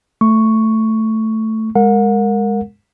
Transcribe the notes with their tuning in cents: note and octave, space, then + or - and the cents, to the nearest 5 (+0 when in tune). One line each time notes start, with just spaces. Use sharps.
A3 +0 C#6 +0
G#3 -15 A#4 -10 F#5 -35